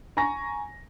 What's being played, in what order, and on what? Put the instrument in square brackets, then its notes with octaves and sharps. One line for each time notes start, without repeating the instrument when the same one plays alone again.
[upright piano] G#5 A#5 C#6 A#6